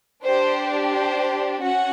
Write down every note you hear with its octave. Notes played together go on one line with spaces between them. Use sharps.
D4 G4 C5
C5
C#4 F#4 F#5